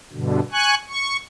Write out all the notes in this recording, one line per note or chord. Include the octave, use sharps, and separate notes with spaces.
G2 B2 D3
G#5 C#6 F#6
C#6